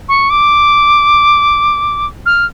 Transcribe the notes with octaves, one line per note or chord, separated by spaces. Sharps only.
C#6
D6
F6